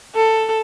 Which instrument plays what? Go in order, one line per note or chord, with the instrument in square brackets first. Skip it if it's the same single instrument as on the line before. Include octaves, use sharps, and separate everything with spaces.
[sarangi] A4